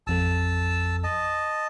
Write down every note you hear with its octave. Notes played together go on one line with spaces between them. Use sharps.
A1 F2 A4 A5 E6
D#5 A5